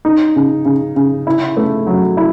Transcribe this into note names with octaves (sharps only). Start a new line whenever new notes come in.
D#4
C#3
C#3
C#3
E4
A3
F#3
E4